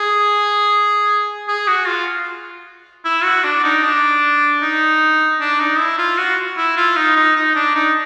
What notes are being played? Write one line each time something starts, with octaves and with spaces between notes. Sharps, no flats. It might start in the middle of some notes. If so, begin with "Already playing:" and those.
Already playing: G#4
G#4
F#4
F4
E4
F#4
D4
D#4
D4
D#4
D4
D#4
E4
F4
F#4
E4
F4
D#4
D#4
D#4
D4
D#4